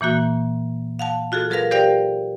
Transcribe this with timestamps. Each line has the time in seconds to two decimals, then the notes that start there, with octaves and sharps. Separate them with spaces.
0.01 A#2 E3 A#3 F#4
0.99 F5 F#5 A5
1.32 F4 F#4 G#4 A4
1.50 F#3 G#4 A#4 B4 F5 A#6
1.71 G4 A#4 C5 D5 F5 G5